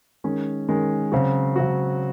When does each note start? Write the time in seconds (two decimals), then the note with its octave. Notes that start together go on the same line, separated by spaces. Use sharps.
0.24 D#3 G#3 C#4
0.69 D#3 G#3 C#4
1.12 C#3 F#3 C4 F#4
1.56 C#3 F#3 C4 F#4